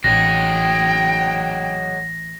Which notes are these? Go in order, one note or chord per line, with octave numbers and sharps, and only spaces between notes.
A1 F#3 D#4 G#4 G5 A#6